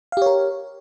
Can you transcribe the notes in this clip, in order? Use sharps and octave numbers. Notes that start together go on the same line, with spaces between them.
G4 A#4 C#5 F5